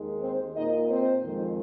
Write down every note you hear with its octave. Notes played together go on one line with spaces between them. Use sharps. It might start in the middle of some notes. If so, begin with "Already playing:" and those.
Already playing: D#2 D#3 G#3
C4 C5
A#2 A#3 D#4 D#5
C4 C5
F2 D#3 G#3